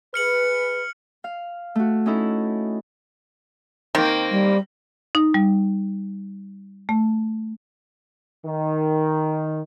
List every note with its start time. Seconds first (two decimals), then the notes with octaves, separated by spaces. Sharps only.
0.14 G#4 B4 F6 C#7 F#7
1.24 F5
1.75 A3 F#4
2.06 C#4 D#4 E4 A4
3.95 D#3 A#3 C4
4.30 G3
5.15 D#4
5.34 G3
6.89 A3
8.45 D#3